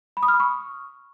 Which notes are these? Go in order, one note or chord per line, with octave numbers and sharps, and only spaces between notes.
B5
D#6
F6
B5
C#6